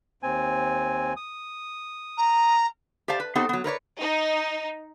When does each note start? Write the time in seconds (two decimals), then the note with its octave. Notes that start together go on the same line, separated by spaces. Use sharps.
0.23 D#2 C4 G#5
1.17 D#6
2.17 A#5
3.08 G4 C5 D5 F5 A5
3.20 B4
3.35 B3 C4 D#4 G4 A4
3.49 F#3 B3
3.64 A#4 B4 C#5 D5
3.99 D#4